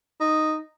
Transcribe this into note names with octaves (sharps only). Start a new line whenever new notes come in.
D#4